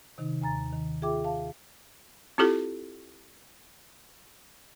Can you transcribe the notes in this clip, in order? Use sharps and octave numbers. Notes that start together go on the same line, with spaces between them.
C3 D#3 D#4
D#2 G#5 A#5 A6
D#3
F4 G#4 E5 G5 D6
F5 A5
C4 E4 F4 G4 A4